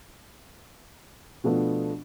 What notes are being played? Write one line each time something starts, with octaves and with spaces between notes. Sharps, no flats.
B2 F3 A3 B3 D4